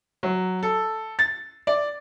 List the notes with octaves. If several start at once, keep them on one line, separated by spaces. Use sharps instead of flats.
F#3
A4
A6
D5